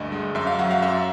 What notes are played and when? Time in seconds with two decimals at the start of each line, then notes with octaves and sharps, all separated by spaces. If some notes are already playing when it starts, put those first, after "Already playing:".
Already playing: D2 G2 D#5
0.12 G#3
0.35 F#2 E5
0.47 F5
0.59 F#3 F#5
0.71 F5
0.82 F#2 E5